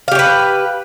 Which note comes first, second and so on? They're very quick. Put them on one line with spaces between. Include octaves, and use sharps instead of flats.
F5 G4 C#5 B4